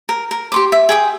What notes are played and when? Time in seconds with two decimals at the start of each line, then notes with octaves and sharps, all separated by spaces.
0.09 A#4
0.31 A#4
0.52 G4 C6 D6
0.72 E5
0.89 G#4 G5 D#6